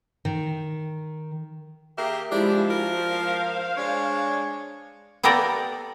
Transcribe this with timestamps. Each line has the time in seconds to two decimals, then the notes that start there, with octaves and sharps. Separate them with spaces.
0.25 D#3
1.98 A#3 G4 G#4 E5
2.31 F3 G#3 D4 E4 G4
2.70 F#4 A#4
3.08 C5 F5
3.77 G#3 D4 C#5
5.23 A#3 B3 G4 A4 A#4 D5